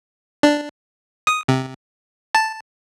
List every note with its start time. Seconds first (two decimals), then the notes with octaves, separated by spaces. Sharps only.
0.43 D4
1.27 D#6
1.48 C3
2.35 A5